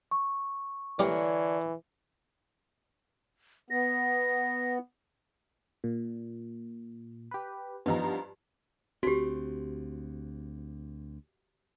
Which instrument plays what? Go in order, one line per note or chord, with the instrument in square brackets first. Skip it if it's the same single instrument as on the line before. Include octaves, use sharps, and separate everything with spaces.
[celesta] C#6
[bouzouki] D3 A#4 C#5 [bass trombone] E3 [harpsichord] G3 A#3 C#4
[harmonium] B3 [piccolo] A#6
[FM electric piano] A#2
G4 B4
[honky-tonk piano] G2 F3 A#5 [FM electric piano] B3 D#4
[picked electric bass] D2 C4 [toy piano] F#4 G4